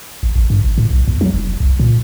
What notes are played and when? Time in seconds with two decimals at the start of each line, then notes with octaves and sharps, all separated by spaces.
0.23 G#1
0.35 A1
0.50 G2
0.65 G#1
0.78 A2
0.91 B1
1.08 E2
1.21 F#3
1.34 F1
1.60 C2
1.80 A#2